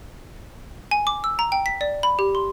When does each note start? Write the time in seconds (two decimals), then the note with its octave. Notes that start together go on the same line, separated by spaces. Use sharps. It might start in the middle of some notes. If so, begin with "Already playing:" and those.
0.91 G#5
1.07 D6
1.24 E6
1.39 A#5
1.52 G5
1.66 B6
1.81 D5
2.03 B5
2.19 G4
2.35 C6